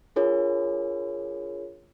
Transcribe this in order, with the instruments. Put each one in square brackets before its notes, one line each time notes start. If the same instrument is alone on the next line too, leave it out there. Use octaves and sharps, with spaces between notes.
[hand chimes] D4 F4 G#4 A#4 C#5